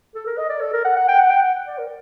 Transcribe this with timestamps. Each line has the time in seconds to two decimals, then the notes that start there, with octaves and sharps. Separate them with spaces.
0.15 A4
0.26 A#4
0.38 D#5
0.50 D5
0.61 A4
0.73 A#4
0.85 F#5
0.96 F#5
1.08 G5
1.20 F#5
1.31 G5
1.41 F#5
1.67 D5
1.78 A#4